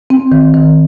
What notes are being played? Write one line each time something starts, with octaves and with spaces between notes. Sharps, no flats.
C4
D#3
D#3